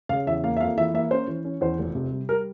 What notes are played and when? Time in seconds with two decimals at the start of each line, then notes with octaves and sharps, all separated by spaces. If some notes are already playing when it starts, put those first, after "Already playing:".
0.09 C#3 F5
0.27 E2 E5
0.44 A#3 F5
0.57 E5
0.60 F2 F5
0.77 E3 E5
0.94 A#3 E5
1.11 C#4 C5
1.28 E3
1.44 C#4
1.61 E2 C5
1.79 F1
1.95 C3
2.12 G3
2.29 G3 A#4